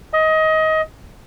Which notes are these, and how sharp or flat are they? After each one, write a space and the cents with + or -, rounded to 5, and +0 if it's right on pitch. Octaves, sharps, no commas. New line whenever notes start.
D#5 +20